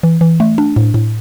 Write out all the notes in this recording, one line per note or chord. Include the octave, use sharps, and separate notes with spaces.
E3
E3
A3
D4
A2
A2